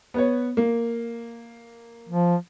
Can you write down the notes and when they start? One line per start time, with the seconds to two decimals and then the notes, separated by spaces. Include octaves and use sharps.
0.14 B3 B4 C#5
0.57 A#3
2.09 F3